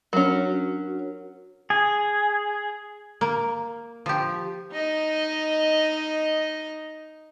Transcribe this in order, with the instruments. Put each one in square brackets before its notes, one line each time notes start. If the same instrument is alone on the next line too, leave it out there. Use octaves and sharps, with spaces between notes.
[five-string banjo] F#3 C#4 [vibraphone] D4 F#4 A#4
[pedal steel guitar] G#4
[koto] A#3
F3 G4
[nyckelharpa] D#4 D#5